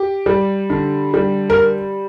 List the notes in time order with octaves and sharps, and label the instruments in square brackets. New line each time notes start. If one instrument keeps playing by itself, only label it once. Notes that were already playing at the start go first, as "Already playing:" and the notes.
Already playing: [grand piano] G4
G3
D3
G3
A#4